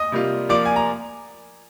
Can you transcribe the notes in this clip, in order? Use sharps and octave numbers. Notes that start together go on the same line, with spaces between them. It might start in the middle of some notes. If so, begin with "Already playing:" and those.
Already playing: D#5 D#6
C3 G3 A#3 F4
F3 A#3 F4 D5 D6
G#5
A#5